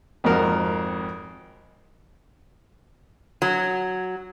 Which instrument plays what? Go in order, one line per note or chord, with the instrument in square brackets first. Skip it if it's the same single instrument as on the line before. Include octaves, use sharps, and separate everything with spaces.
[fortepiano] G#1 F2 C4 F#4 A#4 A#5
[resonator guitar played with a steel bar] F#3